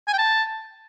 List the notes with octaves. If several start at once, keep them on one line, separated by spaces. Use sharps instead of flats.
G#5
G5
A5